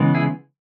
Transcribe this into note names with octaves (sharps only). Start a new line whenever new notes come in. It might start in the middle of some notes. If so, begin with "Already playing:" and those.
Already playing: C#3 E3 G#3 B3
E4 G#4